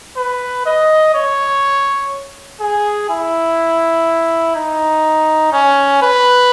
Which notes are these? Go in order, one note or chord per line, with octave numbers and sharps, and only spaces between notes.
B4
D#5
C#5
G#4
E4
D#4
C#4
B4